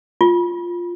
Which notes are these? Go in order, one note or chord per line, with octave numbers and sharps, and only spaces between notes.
F4